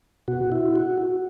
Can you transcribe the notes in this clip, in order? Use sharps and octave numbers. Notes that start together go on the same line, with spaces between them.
B2 F#4
E4
F#4